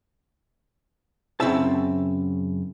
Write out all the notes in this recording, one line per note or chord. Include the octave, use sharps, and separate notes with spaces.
F#2 C#3 C4 E4 E5 A5